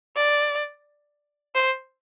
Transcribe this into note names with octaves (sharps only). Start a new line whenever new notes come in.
D5
C5